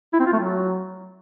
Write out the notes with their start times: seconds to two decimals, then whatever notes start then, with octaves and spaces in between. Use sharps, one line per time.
0.13 E4
0.20 C4
0.26 F4
0.32 A3
0.39 F#3